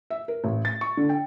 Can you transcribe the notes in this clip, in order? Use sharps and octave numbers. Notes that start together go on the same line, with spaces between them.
E5
A#4
A1
A6
C#6
D3
G5